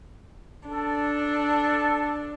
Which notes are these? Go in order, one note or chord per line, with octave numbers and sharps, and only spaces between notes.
D4 A4